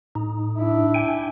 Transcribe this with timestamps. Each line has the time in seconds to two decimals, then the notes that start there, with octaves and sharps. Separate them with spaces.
0.15 A2 D#4
0.58 D4 E4
0.94 G5 G#5